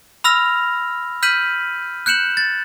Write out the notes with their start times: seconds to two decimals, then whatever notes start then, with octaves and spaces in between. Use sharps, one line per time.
0.24 B5 E6 F6 A#6 F7
1.23 F6 G6 B6 D#7 F#7
2.06 F#6 G6 C#7 E7 F#7
2.37 A6